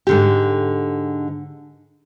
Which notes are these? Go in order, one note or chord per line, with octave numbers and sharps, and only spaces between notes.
G#2 D3 G4